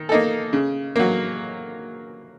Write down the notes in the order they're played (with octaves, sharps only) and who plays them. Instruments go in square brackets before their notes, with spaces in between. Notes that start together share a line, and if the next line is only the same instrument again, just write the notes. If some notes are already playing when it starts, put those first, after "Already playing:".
Already playing: [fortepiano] D#3
A#3 D#4 A4
C#3
F#3 A#3